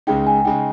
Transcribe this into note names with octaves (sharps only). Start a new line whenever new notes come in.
C#2 C#3 G#3 D#4 G5
G#5
C#3 G#3 D#4 G5